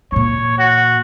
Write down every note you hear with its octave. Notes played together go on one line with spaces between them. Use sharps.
A#2 E3 C#5
F#4